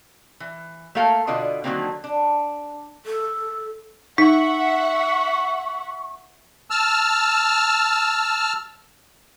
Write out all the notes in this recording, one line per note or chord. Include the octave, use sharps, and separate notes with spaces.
E3
A3 A#3 A4 F5 G5
B2 D3 F4 D5 D#5
D3 D#3 F#3 G3 A#3 C4
D4
A4
D#4 E5 F#5 C#6 B6
A5 E6 F6